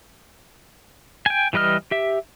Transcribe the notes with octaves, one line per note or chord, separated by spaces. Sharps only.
G5 G#5
E3 G3 B4 D#5 F6
G4 E5